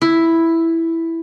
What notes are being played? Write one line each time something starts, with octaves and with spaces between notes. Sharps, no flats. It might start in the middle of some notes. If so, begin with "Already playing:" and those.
E4